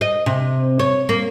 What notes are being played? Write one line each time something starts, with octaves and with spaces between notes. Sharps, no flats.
D#5
C3
C#5
A#3